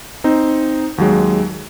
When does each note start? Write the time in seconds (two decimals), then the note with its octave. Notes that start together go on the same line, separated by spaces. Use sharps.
0.24 C4 D#4
0.98 D#2 F#3 G#3